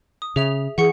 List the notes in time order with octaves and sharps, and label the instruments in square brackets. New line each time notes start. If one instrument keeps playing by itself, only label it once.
[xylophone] D#6
[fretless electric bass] C#3 [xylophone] G#4 E5 F7
[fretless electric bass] E3 [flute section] G#4 [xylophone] F#5 C#6 C#7